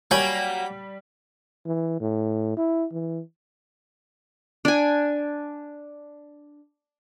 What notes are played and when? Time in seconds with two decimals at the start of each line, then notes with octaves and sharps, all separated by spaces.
0.11 F#3 G3 A#3 C#5 G5 G#5 B5
1.66 E3
2.00 A2
2.57 E4
2.92 E3
4.65 D4 G#5